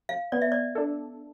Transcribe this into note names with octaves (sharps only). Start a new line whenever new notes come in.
F5
B3 D5
E5
D5
D4 A4